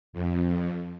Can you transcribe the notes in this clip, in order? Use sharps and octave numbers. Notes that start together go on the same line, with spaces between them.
F2